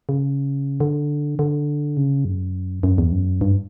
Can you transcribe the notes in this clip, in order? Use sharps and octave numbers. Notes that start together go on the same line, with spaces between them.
C#3
D3
D3
C#3
F#2
F#2
E2
F#2
G2